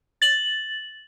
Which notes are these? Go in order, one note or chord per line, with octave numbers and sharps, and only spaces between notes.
A6 F#7